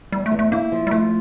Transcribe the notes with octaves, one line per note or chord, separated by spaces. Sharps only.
E2 G3
A3
E2
A3
A#3 E4
F3
G3
F3 A3